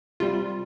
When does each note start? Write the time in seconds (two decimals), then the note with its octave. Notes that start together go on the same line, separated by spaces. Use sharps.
0.20 C3 G3 F4